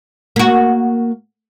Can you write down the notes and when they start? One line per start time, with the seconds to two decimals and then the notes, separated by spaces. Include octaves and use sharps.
0.36 A#3 F#4